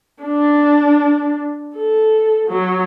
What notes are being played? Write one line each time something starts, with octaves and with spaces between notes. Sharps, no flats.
D4
A4
F#3